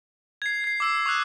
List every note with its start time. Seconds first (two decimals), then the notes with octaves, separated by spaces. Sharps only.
0.42 G#6 C7
0.64 G#6 C7
0.80 D6 E6 C7
1.06 C#6 D#6 E6 F#6